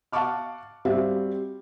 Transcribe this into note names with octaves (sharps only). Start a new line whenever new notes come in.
F5 F#5 A5 C#6 D6 F6
G3 C4 F#4 G4 E5 F5